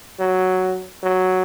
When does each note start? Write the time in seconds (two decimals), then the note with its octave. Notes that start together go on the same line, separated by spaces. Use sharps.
0.19 F#3
1.03 F#3